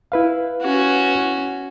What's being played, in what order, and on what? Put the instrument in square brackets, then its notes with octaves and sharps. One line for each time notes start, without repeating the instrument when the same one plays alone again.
[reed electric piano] E4 B4 F5
[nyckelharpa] C#4 F#4